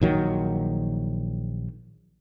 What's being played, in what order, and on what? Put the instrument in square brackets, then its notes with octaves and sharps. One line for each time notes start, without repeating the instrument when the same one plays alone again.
[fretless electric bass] A#1 D#3 F#3